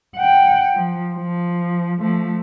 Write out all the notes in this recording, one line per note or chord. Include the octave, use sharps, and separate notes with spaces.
F#5 G5
F3
F3
F3 A3